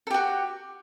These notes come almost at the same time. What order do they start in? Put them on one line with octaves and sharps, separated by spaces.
A4 G4 F#4